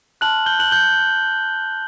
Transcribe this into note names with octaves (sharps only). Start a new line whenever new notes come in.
A5 C6 F6 F#6 F#7
G6 G7
F#6 F#7
G6 G7